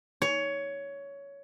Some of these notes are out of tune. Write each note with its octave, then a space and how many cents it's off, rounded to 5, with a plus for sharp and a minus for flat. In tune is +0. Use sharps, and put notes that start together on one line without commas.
C#5 +15